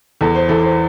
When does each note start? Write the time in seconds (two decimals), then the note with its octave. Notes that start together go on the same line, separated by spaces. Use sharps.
0.21 E2 A4
0.35 C5
0.49 E3 A4
0.63 C5